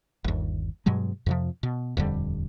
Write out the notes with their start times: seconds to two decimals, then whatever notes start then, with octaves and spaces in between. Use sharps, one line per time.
0.24 G1 D#2
0.86 G2 B2 F#3 G#3
1.26 F2 C3 F3
1.63 B2
1.97 D#1 F2 D3 G3